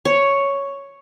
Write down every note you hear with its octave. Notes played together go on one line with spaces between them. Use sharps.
C#5